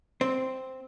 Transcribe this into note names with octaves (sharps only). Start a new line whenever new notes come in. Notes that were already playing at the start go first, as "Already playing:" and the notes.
C4